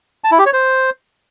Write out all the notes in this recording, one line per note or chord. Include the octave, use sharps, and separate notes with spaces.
A5
E4
G4
C#5
C5